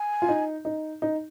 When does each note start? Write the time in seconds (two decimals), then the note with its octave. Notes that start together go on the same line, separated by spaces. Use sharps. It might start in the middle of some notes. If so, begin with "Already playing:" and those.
Already playing: G#5
0.22 F4
0.29 D#4
0.65 D#4
1.02 D#4